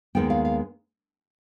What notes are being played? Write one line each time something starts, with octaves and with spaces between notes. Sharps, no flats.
D#2 D#3 G#3 B3 G5
F5
F5